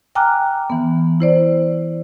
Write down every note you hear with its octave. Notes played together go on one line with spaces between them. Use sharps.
G5 G#5 A#5 D6 F6 F#6
E3 B3
E4 C5 D5